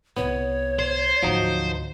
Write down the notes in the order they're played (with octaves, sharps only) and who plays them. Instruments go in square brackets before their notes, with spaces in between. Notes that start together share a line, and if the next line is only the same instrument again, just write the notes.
[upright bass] C2 [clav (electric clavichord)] B3 [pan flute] C#5
[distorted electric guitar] C5
[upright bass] D2 G#2 [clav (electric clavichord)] F3 F#3 D#4